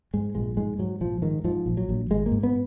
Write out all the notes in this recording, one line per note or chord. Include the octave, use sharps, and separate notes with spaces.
G#2 G#3
A#1 G#3
G#2 G#3
G#2 F#3
A#1 F3
G#2 D#3
G#2 F3
A#1
F#3
A#1
G#1 G#3
A#3
G#2
B3